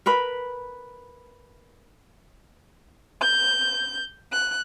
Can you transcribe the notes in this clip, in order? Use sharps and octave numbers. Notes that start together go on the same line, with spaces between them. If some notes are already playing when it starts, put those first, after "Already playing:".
A#4 B4 B5
G6
F#6